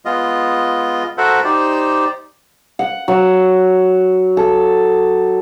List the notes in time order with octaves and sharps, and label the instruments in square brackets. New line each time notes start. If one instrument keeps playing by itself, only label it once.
[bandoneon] G#3 B3 F4 D#5
F#4 A4 A#4 C5 E5 F#5
D#4 G4 C5 D5
[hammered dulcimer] F#5
F#3 F#5
A4